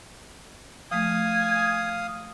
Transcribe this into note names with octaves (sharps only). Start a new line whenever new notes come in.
F3 A3 F5 G#5 D#6